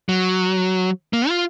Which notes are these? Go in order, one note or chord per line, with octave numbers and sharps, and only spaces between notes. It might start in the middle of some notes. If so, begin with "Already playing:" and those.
F#3
A#3
F4